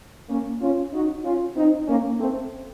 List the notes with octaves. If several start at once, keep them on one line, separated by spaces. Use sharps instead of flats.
A#3 C#4
C#4 F4
D#4 F#4
C#4 F4
C4 D#4
A#3 C#4
A3 C4